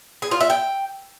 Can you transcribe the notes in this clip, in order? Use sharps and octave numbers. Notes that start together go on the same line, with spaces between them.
G#4
F4
E5
G5